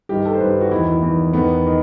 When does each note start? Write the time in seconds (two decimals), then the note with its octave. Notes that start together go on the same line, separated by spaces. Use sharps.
0.09 G2 D#3 G4
0.25 A4
0.34 C5
0.41 G2 D#3 B4
0.51 G4
0.61 F#4
0.71 E2 D#3 E4
0.87 E4
1.02 E2 D#3
1.33 E2 D#3 B3
1.66 D#3